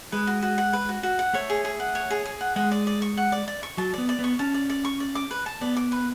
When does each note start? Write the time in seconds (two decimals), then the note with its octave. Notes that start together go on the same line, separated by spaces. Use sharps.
0.12 G#3 B4
0.27 F#4
0.42 F#4
0.58 F#5
0.73 B4
0.89 F#4
1.03 F#4
1.19 F#5
1.33 A3 C#5
1.50 G#4
1.65 G#4
1.80 F#5
1.95 C#5
2.10 G#4
2.26 G#4
2.41 F#5
2.56 G#3 F#5
2.71 D5
2.87 D5
3.02 C#6
3.17 F#5
3.32 D5
3.48 D5
3.63 C#6
3.78 F#3 A5
3.94 B3 D5
4.09 D5
4.19 B3
4.24 C#6
4.39 C#4 A5
4.54 D5
4.70 D5
4.85 C#6
5.00 D5
5.15 D6
5.31 B4
5.46 A5
5.61 B3 D5
5.77 D6
5.92 B4